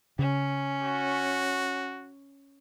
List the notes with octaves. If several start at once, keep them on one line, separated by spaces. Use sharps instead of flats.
C#3 C#4
F#4